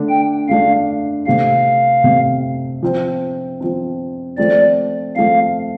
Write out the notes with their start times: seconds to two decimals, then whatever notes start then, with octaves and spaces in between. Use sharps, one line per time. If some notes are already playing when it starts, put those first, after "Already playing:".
Already playing: D3 A3 D4
0.09 G5
0.48 D3 A3 D4 F5
1.26 C3 A3 C4 F5
2.04 C3 A3 C4
2.83 F3 C4
3.61 F3 C4
4.38 F3 A3 C4 D5
5.16 F3 A3 C4 F5